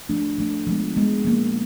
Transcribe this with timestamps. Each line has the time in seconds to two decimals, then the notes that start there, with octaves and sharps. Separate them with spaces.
0.09 F3 A3 D4
0.38 F3 A3 D4
0.67 F3 G#3 B3
0.96 F3 G#3 B3
1.25 F3 A#3 C#4